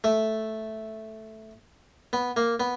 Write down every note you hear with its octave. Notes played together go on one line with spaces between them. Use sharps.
A3
B3
A#3
B3